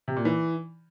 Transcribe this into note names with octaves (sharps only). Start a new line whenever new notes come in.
C3
A#2
E3